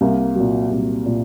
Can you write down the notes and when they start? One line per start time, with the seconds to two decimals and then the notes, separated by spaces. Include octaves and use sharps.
0.01 C2 A#3
0.35 A#2 F#3
0.71 C2
1.06 A#2